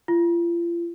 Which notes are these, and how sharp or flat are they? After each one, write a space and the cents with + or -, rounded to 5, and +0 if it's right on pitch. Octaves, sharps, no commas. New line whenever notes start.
F4 -40